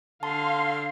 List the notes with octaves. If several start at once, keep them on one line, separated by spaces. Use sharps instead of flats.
D3 F5 A5 C6